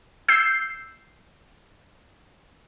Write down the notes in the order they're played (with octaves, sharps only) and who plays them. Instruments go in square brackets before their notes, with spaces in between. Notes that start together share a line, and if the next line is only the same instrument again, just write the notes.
[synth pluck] E6 G6 C7